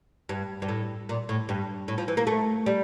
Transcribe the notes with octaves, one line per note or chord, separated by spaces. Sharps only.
G2
G2
A2
A#2
A2
G2
A2
F3
E3
A#3
A3
G3